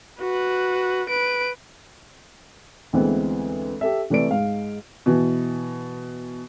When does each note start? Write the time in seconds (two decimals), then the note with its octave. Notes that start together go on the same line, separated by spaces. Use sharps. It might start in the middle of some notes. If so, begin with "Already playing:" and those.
0.20 F#4 B4
1.09 B4 D7
2.93 D2 E3 G#3 B3 C4
3.81 G4 A4 E5
4.10 C3 E3 A3 B4 D5 D7
4.30 G#2 G#3 F5
5.06 B2 E3